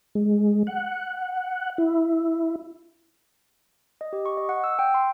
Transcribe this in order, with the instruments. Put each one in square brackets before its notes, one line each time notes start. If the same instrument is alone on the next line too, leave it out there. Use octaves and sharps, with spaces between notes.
[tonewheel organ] G#3
F#5
E4
[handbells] D#5
G4
C#6
D#5
F#5
E6
G5
C6